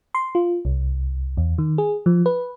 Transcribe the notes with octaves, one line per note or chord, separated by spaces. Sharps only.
C6
F4
C2
E2
D#3
G#4
F3
B4